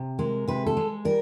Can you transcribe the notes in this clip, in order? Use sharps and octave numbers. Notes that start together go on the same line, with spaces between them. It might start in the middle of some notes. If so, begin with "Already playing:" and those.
Already playing: C3
G#3 A#4
C3 B4
A4
G#3
G3 A#4